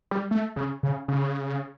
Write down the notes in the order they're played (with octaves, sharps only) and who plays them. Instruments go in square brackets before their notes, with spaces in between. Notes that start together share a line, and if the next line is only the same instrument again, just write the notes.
[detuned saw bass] G3
A3
C#3
C#3
C#3